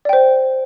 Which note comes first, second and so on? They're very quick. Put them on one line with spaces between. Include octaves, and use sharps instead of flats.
D5 G5 C5